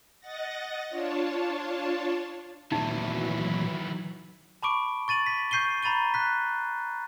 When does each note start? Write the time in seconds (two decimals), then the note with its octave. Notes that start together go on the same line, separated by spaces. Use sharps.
0.20 D#5 F#5 A6 A#6
0.89 D4 F4 C#5 A5
2.72 D2 A#2 D#3 E3 F#3 D#4 E4
4.63 A5 B5 C#6 D6 D7
5.08 C#6 A6 D#7 F#7
5.26 B6
5.51 C#6 G6 C7 D#7 G7
5.83 A#5 B5 A6 D#7 G7
6.14 F#6 B6